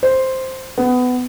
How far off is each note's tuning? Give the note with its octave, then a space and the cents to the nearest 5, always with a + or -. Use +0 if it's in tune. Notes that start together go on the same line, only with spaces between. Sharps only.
C5 +0
B3 +20